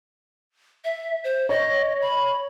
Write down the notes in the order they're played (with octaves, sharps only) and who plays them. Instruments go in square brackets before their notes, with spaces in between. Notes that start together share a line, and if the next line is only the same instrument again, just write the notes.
[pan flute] E5
C5
[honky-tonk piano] C#5 [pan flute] D#5
[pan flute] B5